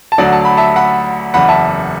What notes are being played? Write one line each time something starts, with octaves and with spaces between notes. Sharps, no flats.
A5
D2 D3 F#3 D5 F#5
A5
B5
E5 A5
F#5 B5
F#1 E2 E3 F#5 B5
E5 A5